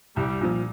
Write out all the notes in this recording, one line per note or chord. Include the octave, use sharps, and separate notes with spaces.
C2 G3
A#2 F3